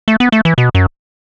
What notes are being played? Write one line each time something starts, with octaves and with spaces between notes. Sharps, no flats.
A3
B3
A3
E3
B2
F#2